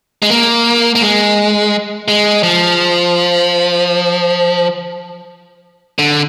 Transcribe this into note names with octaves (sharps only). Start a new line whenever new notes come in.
G#3
A#3
A#3
G#3
G#3
F3
D3